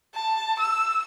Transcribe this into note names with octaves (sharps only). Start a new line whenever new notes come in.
A5
E6